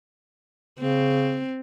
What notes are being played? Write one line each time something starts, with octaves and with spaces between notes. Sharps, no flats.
C#3 C4